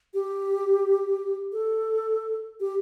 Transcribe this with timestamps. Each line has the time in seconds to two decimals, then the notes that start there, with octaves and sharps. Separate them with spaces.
0.14 G4
1.52 A4
2.60 G4